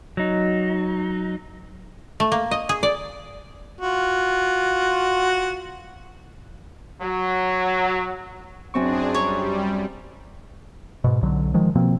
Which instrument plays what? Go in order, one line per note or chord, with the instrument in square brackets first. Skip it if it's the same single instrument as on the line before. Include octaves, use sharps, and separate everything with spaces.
[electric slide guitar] F#3 D#4
[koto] A3
A#3
D#5
G#4
D5
[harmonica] F4 F#4
[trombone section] F#3
[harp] F#2 C4 C#6 [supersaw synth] D4 G#4
[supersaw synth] G3 [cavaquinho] C#5 A#5
[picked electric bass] G#2 B2
B1 D3 F#3
D#3 F3 G#3
B2 F3 A#3 C4